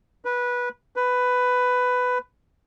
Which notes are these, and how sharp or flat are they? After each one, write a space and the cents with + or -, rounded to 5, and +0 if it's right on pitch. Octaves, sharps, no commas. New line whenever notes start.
B4 -15
B4 +10